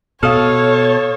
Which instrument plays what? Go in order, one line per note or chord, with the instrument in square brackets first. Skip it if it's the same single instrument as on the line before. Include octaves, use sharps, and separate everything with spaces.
[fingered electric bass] B2 [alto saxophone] A4 [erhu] C#5 [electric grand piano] F5 D#6 F6